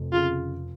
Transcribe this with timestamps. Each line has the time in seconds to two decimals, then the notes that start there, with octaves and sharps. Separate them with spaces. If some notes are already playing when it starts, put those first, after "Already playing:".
Already playing: F1 F2
0.13 C#3 F4